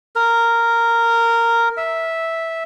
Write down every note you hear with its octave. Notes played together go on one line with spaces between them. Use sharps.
A#4
E5